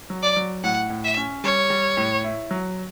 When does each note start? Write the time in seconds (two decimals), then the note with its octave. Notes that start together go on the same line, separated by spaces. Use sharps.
0.10 F#3
0.23 D5
0.36 F#3
0.64 A2 F#5
0.90 A2
1.04 E5
1.17 C#4
1.44 G3 C#5
1.70 G3
1.97 A2
2.24 E4
2.51 F#3